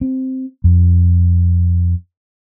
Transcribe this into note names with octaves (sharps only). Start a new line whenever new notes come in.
C4
F2